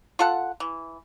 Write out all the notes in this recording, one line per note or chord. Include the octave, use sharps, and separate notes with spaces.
F4 A4 F#5
E3